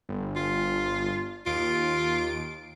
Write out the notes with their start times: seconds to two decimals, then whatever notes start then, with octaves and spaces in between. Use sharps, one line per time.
0.09 G1
0.36 F4
1.46 D#2 F4 D7